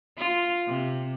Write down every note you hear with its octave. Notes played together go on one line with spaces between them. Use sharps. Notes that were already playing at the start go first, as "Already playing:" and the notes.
F4
C3